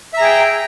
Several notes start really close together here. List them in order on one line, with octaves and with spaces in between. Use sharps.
E5 A#5 G#4 G5